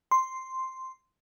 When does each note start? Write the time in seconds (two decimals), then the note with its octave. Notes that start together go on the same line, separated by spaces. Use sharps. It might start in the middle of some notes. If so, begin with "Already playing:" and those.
0.11 C6